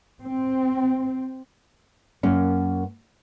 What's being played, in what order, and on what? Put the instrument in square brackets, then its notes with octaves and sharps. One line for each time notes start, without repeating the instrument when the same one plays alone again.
[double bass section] C4
[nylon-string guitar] F#2 A#3 C#4